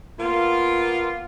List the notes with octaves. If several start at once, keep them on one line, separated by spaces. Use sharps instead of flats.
A#3 B3 F4